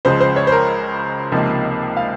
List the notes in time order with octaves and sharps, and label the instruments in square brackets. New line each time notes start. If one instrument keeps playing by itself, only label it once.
[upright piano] C#2 C#3 F3 G#3 C5
C5
C#5
C5
A#4
C#2 C3 F3 A#3 D#4
F5